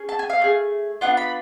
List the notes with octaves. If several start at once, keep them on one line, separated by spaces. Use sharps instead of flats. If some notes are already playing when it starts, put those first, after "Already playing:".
Already playing: C#4 G#4
A5
G#5
F5
A3 D4 G#4
B3 D4 F4 F#5
B5